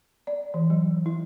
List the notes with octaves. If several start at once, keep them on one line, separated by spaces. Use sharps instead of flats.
D5
E3
F#3
E4